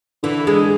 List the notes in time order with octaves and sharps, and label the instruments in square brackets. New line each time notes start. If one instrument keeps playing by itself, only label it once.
[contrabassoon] D3 [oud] E3
[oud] G#3